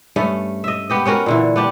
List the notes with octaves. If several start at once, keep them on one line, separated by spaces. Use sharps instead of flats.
G2 A3 C#4
D#5 E5
B3 G4 D#5
B3 C#4 F#4 A#4
A#2 D3 E3
B3 D4 G4